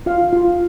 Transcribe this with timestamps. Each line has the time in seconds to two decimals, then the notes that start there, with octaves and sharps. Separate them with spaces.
0.06 F4 F5
0.33 F4